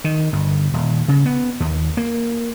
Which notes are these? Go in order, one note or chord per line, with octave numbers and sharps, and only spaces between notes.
D#3
G1
D#1
C#3
B3
D#2
A#3